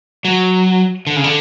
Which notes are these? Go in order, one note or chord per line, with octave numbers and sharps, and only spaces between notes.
F#3
D3
C#3
D3